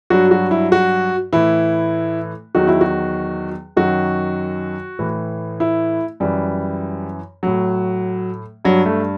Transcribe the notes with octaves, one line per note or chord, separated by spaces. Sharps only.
G2 F#3 F#4
F#4
E4
F#4
A2 E3 E4
E2 D#3 F#3 F#4
E4
F#4
F#2 D#3 F#3 F#4
A2 E3
E4
F#2 E3 G3
A2 F#3
G2 F#3
A3